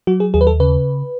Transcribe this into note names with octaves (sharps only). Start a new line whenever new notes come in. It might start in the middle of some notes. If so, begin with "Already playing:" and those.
F#3 F#4
G#4
D#2 G#4
B4
A4
C#3 B4